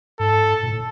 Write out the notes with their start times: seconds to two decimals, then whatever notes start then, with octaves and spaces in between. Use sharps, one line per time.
0.20 G#2 A4
0.63 A#2
0.69 A2